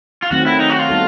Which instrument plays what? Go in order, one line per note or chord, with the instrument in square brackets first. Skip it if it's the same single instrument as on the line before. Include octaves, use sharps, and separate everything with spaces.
[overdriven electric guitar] F4
[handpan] D#3 F#3 A3 C4 [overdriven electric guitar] F#4
[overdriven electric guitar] E4
D#4
F#4
F4
[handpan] G3 B3 D#4 F#4 A4